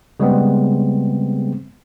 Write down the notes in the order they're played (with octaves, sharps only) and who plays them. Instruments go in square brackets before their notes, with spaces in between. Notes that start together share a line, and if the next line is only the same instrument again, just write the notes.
[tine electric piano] C#3 G3 G#3 B3 C4